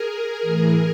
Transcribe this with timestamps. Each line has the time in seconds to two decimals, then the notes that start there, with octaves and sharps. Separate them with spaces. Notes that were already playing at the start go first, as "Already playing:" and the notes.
Already playing: G#4 A#4
0.41 A2 E3